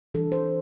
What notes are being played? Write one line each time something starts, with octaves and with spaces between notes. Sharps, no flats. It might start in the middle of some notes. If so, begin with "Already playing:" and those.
E3 G3 D4 A4
C5